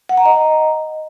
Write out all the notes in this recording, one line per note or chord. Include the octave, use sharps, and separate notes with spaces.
F#5
A#5
D#5